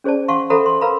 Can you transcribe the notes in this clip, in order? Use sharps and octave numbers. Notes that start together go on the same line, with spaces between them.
C#4 G#4 C5 D5 A5
F5 F#5 A5 C6 C#6
A4 C5 E5 F#5 A#5 B5
C6
A#4 B4 F5 A#5 B5